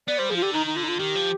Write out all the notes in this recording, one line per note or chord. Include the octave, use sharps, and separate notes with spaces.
B3 D5
G3 C5
F3 G#4
F4
D3 G4
D#3 D#4
D#4
D3 F4
D#4
F4
D#3 G4
F3